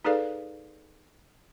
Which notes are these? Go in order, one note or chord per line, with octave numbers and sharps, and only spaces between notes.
D#4 G#4 A4 B4 D5 F5